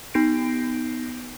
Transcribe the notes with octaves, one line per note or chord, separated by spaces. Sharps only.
B3 D#4 G6 A#6 C7 D7